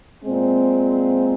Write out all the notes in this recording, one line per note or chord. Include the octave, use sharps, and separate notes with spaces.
A#2 G#3 C4